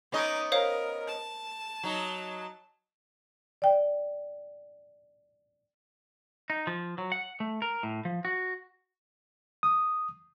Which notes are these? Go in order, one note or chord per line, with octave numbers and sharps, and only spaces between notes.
B3 C#4 D#4 D#5 D6
A#4 C5 C#5 F5
A5
F#3 D#4
D5 G5
D#4
F3
F#3
F#5
A3
A#4
A2
F3
F#4
D#6